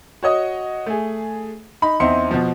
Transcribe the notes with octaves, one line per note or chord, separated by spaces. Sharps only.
F#4 C#5 D#5 D#6
A3 G#4
D#4 B5
E2 C4 D#4 E5 C6 C#7
B2 F3